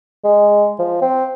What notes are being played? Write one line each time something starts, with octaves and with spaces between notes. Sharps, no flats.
G#3
F3
C4